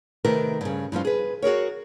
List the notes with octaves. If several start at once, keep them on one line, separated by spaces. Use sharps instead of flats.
C3 D#3 A3 A#4 B4
G2 C#3
G2 F3 C#4 F4
G#4 B4
F#4 G#4 A#4 C#5